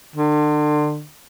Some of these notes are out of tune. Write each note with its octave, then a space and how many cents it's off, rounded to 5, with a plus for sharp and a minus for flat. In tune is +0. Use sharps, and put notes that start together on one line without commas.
D3 +35